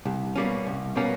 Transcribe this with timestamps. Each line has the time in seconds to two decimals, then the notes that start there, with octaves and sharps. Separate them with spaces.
0.05 C2
0.36 B2 G3 A#3 C#4
0.67 C2
0.96 B2 G3 A#3 C#4